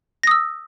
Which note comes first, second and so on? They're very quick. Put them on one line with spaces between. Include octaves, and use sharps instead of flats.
A#6 D#6 E6